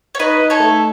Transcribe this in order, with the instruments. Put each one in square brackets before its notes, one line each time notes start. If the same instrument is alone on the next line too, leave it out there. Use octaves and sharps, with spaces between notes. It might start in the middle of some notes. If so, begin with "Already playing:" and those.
[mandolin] C#5
[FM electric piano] D#4 [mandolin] B4 D#5
[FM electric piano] D#4
[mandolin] A4 C#5
[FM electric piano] A3